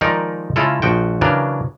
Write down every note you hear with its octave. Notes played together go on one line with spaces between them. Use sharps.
D#3 F3 G#3 D#4 A#4 D5
C#3 G#3 E4 F4 A4
A#1 F3 F#4 G5
C#3 E3 F#3 D4 A#4